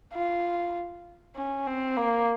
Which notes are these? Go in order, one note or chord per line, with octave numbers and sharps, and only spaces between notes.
F4
C#4
C4
A#3